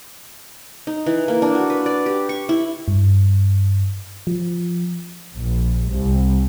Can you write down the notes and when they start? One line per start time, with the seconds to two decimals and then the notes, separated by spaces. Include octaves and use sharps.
0.87 D#4
1.06 E3
1.28 A#3
1.42 D4
1.55 F#4
1.70 B4
1.86 D5
2.06 G4
2.29 C#6
2.49 E4
2.88 G2
4.27 F3
5.35 A#1
5.91 C2